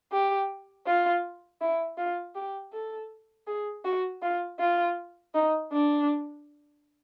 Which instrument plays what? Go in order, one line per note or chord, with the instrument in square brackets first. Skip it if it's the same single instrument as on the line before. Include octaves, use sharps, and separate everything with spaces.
[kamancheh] G4
F4
E4
F4
G4
A4
G#4
F#4
F4
F4
D#4
D4